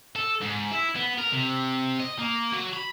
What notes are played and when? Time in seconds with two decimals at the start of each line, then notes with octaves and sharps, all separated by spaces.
0.16 A4
0.41 G#2
0.71 E4
0.96 B3
1.18 A#4
1.32 C3
2.00 D#5
2.19 A#3
2.53 F#3
2.74 B5